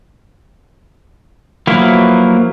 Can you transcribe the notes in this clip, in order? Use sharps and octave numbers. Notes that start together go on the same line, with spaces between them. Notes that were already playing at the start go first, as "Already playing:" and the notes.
F3 F#3 A#3 B3 E4